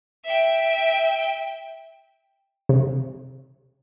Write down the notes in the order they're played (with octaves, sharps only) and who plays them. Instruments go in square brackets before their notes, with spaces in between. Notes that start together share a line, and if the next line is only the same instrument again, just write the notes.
[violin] E5 G5
[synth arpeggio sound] C3